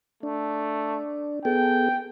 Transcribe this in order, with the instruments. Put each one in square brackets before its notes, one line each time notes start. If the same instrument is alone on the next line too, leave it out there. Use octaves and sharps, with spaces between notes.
[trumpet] A3 [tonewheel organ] D4
[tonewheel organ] B3 G#4 A4 [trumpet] G5